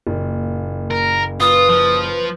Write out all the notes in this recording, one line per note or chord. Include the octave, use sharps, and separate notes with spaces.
F#1 A#2
A#4
F4 B4 D#6
F3